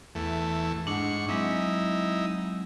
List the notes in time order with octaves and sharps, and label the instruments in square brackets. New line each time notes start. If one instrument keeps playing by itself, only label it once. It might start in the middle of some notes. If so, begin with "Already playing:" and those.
[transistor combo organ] E2 A3
[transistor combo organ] G#2 C#6 [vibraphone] D4 F#5
[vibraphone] F#3 G#3 C4 [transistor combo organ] D#4 E4